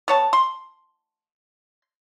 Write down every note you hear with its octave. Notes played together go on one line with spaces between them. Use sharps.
B3 C#5 A5
C6